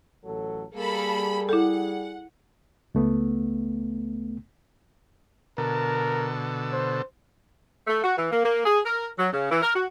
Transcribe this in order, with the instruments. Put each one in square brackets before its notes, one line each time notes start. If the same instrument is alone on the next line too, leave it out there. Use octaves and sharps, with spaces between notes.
[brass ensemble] A1 F#3 A4
[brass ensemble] G3 G#4 [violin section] A#3 A4 B5
[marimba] E4 A4 [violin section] F#5
[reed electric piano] C#2 A3 B3
[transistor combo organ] B2 D3 A4 [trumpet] A#4
[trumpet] C5
[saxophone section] A3
F#4
E3
A#3
A#3
G#4
A#4
F#3
C#3
E3
A#4
F#4